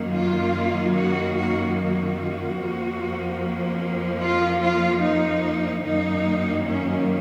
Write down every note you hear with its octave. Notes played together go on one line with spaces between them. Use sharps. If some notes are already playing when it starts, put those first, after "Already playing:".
Already playing: F#2 D#3 A#3
F4
F#4
F#4
F#4
F2 F3 A#3
F4
F4
D#4
F#2 D#3 A#3 D#4
C#4